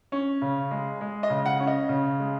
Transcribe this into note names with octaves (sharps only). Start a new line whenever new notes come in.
C#4
C#3
G#3
G#3
D#5
C#3
F#5
C#4
D#5
C#3
G#3